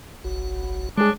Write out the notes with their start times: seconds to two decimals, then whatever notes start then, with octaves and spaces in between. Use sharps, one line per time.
0.24 F#1 B1 F#4
0.98 G3 G#3 D4 G#4 C#5